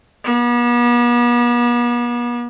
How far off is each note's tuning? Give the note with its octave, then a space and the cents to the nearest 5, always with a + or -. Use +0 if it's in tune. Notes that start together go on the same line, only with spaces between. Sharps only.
B3 -45